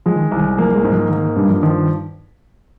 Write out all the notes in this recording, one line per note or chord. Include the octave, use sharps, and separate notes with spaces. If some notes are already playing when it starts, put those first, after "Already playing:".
F3 G#3
D#3
C2
D#3
F3 A#3
G#3
G#2
F3
D#3 A#3
G2 G3
F3
D#3 F3